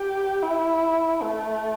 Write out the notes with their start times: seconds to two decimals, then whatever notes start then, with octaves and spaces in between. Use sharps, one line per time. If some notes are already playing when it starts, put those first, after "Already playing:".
Already playing: G4
0.43 E4
1.22 A3